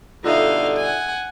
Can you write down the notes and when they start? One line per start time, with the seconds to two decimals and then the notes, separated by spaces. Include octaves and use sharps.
0.24 G2 B2 D3 D#4 F4 A4 E5 F5
0.77 F#5 G#5